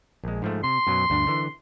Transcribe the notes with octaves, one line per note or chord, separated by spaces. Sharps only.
A#1 G#3
G#2 F3 A3
C3 C6
F#2 B2 F#3
D2 G2 D4
D3 E3